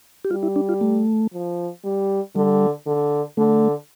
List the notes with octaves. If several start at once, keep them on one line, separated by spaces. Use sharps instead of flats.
G4
G3 F4
E4
D4
F4
A3
F3
G3
D3 G3
D3
D3 A3